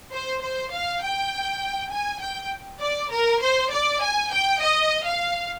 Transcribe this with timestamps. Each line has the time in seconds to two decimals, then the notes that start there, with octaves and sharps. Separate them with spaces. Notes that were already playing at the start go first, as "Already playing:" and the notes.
0.13 C5
0.42 C5
0.72 F5
1.03 G5
1.92 G#5
2.21 G5
2.81 D5
3.11 A#4
3.42 C5
3.72 D5
4.02 G#5
4.31 G5
4.61 D#5
5.06 F5